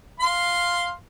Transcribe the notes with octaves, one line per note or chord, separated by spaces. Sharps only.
F5 C6